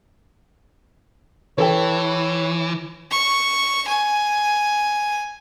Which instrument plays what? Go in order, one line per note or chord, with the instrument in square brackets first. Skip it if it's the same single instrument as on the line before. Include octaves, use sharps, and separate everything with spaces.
[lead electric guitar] E3 [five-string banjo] G4 A4 B4 [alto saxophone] C#5
[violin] C#6
G#5